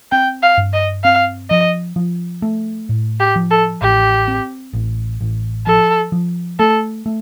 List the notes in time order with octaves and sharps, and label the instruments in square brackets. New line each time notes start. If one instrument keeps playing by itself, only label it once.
[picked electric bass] C4 [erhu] G5
[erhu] F5
[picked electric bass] G2
[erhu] D#5
[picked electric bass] C4 [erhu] F5
[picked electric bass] F3 [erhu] D#5
[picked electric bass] F3
A3
A2
[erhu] G4
[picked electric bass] F3
[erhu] A4
[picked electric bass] A1 [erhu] G4
[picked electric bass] C4
A1
A1
[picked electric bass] F3 [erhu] A4
[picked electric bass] F3
[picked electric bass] A3 [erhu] A4
[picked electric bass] A3